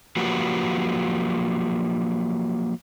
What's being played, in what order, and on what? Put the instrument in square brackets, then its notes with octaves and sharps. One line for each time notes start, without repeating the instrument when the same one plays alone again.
[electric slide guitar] F3 F#3 A#3 F#4 G4 B4